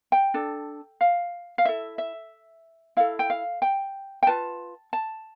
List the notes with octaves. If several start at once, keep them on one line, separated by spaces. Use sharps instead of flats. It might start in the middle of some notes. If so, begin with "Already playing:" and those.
G5
D4 A4
F5
F5
E4 A4 E5
E5
E4 A4 F5
G5
F5
G5
G5
F4 B4 A5
A5